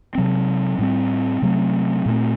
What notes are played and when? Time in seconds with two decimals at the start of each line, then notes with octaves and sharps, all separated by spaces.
0.15 C3 F#3 C4
0.79 A2 G3 C4
1.42 C3 F#3 A3 C4
2.06 A#2 A3 C4